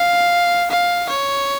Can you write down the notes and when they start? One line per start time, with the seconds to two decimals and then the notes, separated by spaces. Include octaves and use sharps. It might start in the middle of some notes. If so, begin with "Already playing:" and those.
Already playing: F5
0.71 F5
1.09 C#5